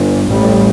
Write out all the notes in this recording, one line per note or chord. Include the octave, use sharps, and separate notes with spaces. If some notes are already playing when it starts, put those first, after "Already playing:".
Already playing: G1 G2
A1 A2 G3